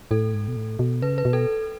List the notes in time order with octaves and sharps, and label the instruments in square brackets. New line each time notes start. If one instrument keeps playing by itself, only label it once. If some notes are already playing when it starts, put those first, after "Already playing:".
[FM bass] A2 [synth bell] A4
[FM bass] G#2
B2
A2
B2
[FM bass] C#3 [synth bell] B4
[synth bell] B4
[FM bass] B2
[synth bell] A4